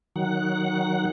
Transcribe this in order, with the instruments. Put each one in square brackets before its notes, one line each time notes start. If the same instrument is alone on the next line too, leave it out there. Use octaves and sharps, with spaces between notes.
[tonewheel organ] D#3 F#3 F#5